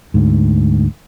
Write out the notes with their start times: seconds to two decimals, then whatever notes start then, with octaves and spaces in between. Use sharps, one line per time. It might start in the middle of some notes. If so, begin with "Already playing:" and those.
0.14 D2 G#2